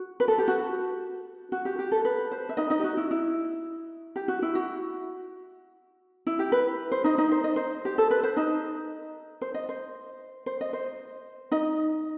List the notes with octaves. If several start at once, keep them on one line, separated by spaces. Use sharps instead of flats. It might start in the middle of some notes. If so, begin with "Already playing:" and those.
Already playing: F#4
B4
A4
G4
F#4
F#4
G4
G4
A4
B4
C5
E5
D#4 D#5
D#4 D#5
G4
F#4
E4
E4
G4
F#4
E4
F#4
E4
G4
B4
C5
D#4 D#5
D#4 D#5
C5
D#5
C5
G4
A4
B4
C5
D#4 D#5
C5
D#5
C5
C5
D#5
C5
D#4 D#5